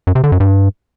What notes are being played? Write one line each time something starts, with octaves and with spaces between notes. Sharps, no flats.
F#2
C3
D3
F#2
G2